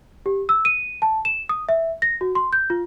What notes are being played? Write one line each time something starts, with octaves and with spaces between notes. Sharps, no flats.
G4
E6
D#7
A5
E7
D#6
E5
A#6
F#4
C6
G6
F4